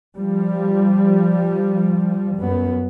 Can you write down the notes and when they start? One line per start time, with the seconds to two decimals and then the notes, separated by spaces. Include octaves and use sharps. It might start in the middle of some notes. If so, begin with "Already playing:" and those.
0.17 F3 G3
2.38 F#2 B3